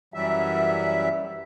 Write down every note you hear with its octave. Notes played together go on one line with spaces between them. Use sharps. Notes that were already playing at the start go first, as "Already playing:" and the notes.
F#2 E3 F#3 G3 E5